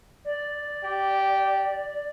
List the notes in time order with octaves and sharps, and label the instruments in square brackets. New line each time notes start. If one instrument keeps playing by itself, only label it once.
[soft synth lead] D5
[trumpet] G4